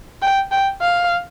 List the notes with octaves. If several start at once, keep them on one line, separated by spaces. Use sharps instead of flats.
G5
G5
F5